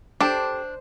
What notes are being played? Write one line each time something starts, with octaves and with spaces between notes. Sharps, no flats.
D4 G4 A4 C5